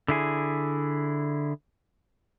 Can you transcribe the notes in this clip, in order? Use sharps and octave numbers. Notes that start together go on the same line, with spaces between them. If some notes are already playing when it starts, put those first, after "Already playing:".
D3 E4 G#4